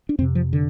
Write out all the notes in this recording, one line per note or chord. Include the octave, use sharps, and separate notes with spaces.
D4
F2 C3 C4
F3
D3